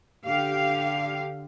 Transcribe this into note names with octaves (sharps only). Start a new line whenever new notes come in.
D3 G4 F5